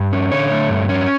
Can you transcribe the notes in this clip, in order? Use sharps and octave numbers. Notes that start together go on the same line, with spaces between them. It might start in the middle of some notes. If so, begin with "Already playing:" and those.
Already playing: G2
C#4
D3 C#5
A3
G2
C#4